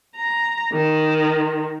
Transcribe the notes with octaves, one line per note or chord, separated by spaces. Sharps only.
A#5
D#3